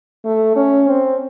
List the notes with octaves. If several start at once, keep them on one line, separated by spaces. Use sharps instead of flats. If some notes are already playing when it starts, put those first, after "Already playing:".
A3
C#4
C4